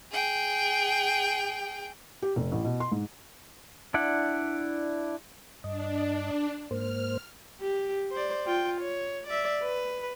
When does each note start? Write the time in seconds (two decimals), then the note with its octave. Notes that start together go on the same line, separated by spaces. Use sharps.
0.12 G#4 G5
2.22 G4
2.36 F1
2.52 A1
2.64 B2
2.80 C6
2.92 G#2
3.94 D4 E4 D5 F#5
5.64 G2 D4 D#5
6.71 G#2 A#3 C5 F6
7.60 G4
8.12 C5 D5
8.47 F4 G5
8.81 C#5
9.27 D5 E5
9.62 B4